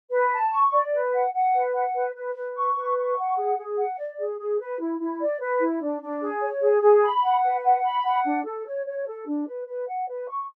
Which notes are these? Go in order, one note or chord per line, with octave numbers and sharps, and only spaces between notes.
B4
A5
C#6
D5
B4
F#5
F#5
B4
F#5
B4
B4
B4
C#6
B4
C#6
F#5
G#4
G#4
F#5
D5
G#4
G#4
B4
E4
E4
D5
B4
E4
D4
D4
G#4
C#5
G#4
G#4
B5
F#5
B4
F#5
B5
F#5
D4
A4
C#5
C#5
A4
D4
B4
B4
F#5
B4
C#6